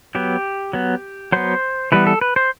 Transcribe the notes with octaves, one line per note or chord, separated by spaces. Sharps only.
F#3 B3 G4
F#3 B3
F#3 B3 C5
E3 G3 B3 B4
A4
B4
C5